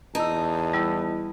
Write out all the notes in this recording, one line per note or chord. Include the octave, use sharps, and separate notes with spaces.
E2 D#4 A5 A#5 E6
G3 B3 E4